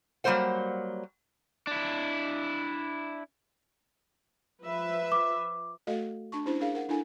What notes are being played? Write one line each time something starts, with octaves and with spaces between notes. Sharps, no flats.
F#3 G3 A#3 A#4 C5 F#5
D4 E4
F3 B4 E5
D6
A3 F#4 A4 D#5 F5
D4 A5 C#6
C#4 D4 E4 G4 C5
D4 G#4 A#4 F5
A#4 F#5
D4 E4 A4 G#5